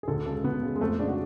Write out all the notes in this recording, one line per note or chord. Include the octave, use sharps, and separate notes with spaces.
G#4
D2 A4
C#3 G#3 A4
D2 B3
C#3 G#3
G#3
F2 A3
C#3 G#3 D4
F#4